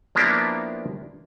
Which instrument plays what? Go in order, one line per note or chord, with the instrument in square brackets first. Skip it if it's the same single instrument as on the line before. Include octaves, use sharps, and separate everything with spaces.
[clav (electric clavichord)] F3 A#3 B3 D4 E4 G4